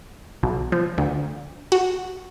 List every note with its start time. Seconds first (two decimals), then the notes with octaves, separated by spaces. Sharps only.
0.43 B1
0.72 F3
0.98 D2
1.72 F#4